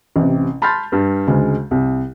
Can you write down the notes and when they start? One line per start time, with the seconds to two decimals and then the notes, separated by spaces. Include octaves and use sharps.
0.16 A1 C3
0.62 A5 B5 C6 F6 G6 A6
0.92 G2
1.27 D2 C#3 G#3
1.71 C2